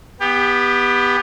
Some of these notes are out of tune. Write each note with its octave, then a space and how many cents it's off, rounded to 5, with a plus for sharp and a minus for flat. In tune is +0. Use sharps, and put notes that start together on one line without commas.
B3 +0 G4 +25